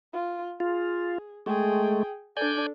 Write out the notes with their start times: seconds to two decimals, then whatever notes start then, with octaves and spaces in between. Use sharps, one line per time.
0.13 F4
0.60 F4 G#4
1.46 G#3 A3 G#4 G5
2.37 D4 A4 D5 G#5 G6